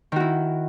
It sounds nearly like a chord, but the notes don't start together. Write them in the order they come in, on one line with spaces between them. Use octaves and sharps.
D#3 F#4 E4